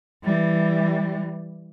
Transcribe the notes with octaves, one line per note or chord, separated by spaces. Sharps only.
E3 G3